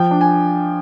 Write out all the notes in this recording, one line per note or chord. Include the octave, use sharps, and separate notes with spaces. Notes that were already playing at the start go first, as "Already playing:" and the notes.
Already playing: F3 G5
D4
G#5